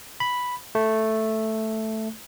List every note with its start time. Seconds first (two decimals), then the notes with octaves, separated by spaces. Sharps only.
0.20 B5
0.75 A3